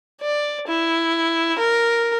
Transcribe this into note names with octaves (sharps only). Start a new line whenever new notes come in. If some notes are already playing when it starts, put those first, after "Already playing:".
D5
E4
A#4